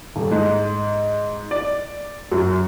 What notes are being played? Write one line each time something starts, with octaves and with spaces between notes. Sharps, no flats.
D#1
G#2
D5
F#2